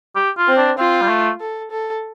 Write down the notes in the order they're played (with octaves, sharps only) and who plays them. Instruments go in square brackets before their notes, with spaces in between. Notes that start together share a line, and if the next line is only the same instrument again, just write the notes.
[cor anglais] G4
F4
[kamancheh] C4
[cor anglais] D4
[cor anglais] C4 [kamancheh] F4
[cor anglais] G3
A3
[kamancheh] A4
A4